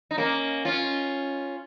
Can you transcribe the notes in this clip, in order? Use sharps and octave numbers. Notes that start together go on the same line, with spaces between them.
D#4
A#3 C#4
C#4 F4